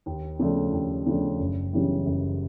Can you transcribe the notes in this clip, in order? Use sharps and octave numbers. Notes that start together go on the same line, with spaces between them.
D#2
C#3 F3 A3 D4
D#2
C#3 F3 A3 D4
F#1
F#2 C#3 E3 G3
F#1